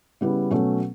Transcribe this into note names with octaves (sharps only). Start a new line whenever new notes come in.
C#3 G3 B3 E4
B2 F#3 A3 C#4